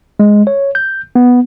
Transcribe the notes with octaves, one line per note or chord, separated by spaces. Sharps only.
G#3
C#5
G6
B3